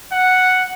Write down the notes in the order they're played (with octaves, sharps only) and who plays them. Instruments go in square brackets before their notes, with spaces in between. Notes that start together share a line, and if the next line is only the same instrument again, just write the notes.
[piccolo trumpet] F#5